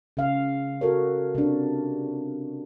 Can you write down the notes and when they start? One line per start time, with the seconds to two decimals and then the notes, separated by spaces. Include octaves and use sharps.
0.17 C#3 F5
0.81 F#4 A4 A#4 C#5
1.35 C3 D4